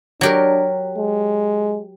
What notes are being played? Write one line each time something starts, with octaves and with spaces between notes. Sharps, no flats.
F#3 D4 G4 A#4
G#3